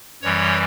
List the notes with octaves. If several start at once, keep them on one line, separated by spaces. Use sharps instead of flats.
F#2 E3 G3 C#5